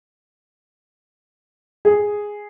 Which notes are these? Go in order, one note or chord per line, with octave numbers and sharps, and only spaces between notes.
G#4